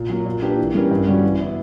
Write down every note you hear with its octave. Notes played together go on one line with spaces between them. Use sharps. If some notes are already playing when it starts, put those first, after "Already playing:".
Already playing: A#2
F#3 A#3
A#2
A#3 D4 G4 B4
E3
G3 C#4 G4 A#4
G2
D3 G3 C#4 F#4
E3
B3 E4